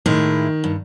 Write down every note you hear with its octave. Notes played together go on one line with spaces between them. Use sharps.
A2 D#3 G#3 E4
G2